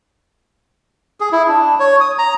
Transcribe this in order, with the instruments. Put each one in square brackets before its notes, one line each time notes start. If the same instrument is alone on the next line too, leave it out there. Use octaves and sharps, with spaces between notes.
[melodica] G#4
E4
D4
C#5
D#6
A#5